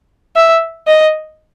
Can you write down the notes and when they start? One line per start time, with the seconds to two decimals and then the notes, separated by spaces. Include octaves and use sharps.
0.36 E5
0.88 D#5